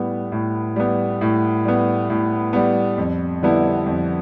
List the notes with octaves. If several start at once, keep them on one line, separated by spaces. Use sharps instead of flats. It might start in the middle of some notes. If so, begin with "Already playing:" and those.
Already playing: A2 G3 B3
A2
G3 B3
A2
G3 B3
A2
G3 B3
F2
D3 G3 B3 E4
F2